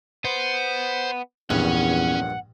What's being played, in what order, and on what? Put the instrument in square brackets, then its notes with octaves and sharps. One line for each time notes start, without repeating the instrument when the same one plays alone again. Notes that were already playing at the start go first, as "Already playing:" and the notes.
[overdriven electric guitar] B3 [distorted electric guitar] C5
[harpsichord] A#1 G2 [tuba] E2 [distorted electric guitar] C#4 [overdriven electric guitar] F#5